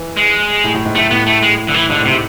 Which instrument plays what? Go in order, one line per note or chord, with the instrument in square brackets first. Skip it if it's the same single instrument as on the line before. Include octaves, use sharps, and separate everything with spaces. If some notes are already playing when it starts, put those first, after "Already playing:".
Already playing: [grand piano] E3
[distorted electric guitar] G#3
[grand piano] A2
A2
G#2
[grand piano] A2 [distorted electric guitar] A3
[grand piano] A2 [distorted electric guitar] B3
[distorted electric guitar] A3
G#3
D3
E3
[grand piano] G#2 [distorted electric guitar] D3
[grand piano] A2
[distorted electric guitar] C3
[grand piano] A2